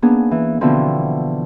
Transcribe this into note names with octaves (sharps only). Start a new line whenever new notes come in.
A#3 B3 C#4 D4 G#4
E3
B2 D3 E3 F3 B3 C4